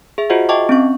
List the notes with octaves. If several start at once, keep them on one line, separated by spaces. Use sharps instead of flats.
G#4 E5
F4 F#4 G#4 C5 D#5 F#5
D#5 E5 G5 A5 C#6 D6
C4 C#4 C#6